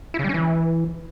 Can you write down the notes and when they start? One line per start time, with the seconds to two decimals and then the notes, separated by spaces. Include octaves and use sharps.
0.14 E4
0.19 C#3
0.24 G3
0.29 C#4
0.34 E3